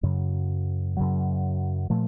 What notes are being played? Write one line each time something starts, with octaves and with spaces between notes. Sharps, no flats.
F#2 C#3 F#3
F#2 C#3 F#3
A#2 F3 A3